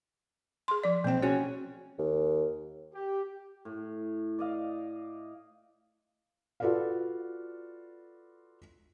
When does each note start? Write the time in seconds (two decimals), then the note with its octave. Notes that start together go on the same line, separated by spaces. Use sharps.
0.68 G#4 C6
0.84 F3 D5
1.04 B1 A#3 C4 G5
1.23 C#4 F#4 G#4 C#5
1.99 D#2
2.94 G4
3.65 A2
4.39 D5 D#5 F5
6.60 F4 F#4 A4 B4 D5 F5